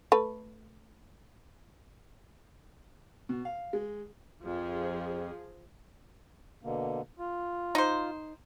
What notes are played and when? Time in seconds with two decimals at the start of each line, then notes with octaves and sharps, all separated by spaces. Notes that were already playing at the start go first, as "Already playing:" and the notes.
0.12 A3 B4
3.29 B2
3.45 F5
3.73 G#3
4.44 F2 F3 G#4
6.64 B2 D3 A#3
7.19 F4
7.75 D#4 C5